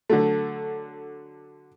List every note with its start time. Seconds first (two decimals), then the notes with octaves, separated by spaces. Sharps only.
0.10 D3 F#3 A3